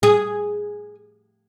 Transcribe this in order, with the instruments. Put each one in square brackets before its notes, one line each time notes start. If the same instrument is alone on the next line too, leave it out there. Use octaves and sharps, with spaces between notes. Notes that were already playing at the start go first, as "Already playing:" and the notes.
[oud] G#4